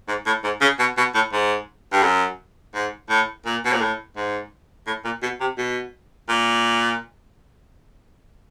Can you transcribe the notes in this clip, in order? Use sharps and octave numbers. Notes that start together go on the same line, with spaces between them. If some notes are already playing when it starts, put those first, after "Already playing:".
G#2
A2
G#2
C#3
B2
B2
A2
G#2
G2
F#2
G#2
A2
A#2
B2
A#2
A2
G#2
A2
A#2
B2
C3
B2
A#2